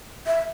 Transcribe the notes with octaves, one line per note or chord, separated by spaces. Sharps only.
E5